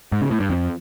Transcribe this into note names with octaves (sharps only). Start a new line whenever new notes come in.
G#2
C#3
A2
G2
F2